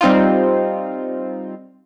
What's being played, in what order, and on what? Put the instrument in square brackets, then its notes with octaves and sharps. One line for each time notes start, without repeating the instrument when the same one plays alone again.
[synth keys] G3 C4 D#4 F4